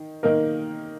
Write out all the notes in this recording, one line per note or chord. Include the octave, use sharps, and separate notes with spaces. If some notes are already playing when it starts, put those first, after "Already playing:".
Already playing: D#3
D#3 A#3 D#4 A#4